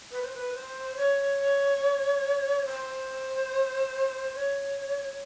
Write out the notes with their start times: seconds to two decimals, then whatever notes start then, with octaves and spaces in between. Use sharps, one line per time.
0.12 B4
0.22 C5
0.34 B4
0.54 C5
0.96 C#5
2.65 C5
4.34 C#5